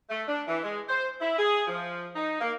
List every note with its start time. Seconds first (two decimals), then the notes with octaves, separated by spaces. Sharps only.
0.10 A3
0.27 D4
0.48 E3
0.63 G#3
0.88 C5
1.21 E4
1.38 G#4
1.67 F3
2.15 D#4
2.41 A#3